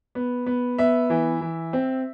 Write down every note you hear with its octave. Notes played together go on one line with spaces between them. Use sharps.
B3
B3
B3 E5
E3
E3
C4